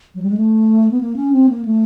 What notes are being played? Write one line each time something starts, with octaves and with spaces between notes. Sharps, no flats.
F#3
G3
G#3
A3
B3
A#3
C#4
C4
A#3
A3